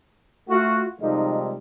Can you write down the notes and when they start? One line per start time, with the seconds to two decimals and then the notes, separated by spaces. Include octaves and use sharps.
0.49 A3 F4 F#4
1.01 C3 D#3 F3 G3 G#3 D#4